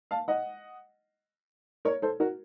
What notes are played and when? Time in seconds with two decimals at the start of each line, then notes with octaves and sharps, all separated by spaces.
0.11 F5 A5
0.28 D#5 F#5
1.85 A#4 C#5
2.02 A4 C5
2.20 F#4 A#4